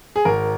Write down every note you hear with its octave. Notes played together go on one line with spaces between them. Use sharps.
G#4
G#1 A#4